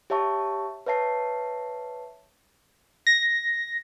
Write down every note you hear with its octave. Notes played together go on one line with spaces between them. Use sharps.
G4 C#5 E5 A5 C#6
B4 C#5 E5 A5 C7
A#6